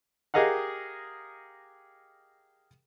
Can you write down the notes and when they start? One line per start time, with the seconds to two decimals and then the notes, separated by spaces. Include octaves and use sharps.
0.34 G4 G#4 A#4 D#5 F5 F#5